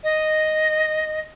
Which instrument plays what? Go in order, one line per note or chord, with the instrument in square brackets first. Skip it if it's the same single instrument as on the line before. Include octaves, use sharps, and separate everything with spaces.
[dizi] D#5